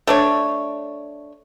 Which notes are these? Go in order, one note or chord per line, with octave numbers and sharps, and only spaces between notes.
A3 D4 C#5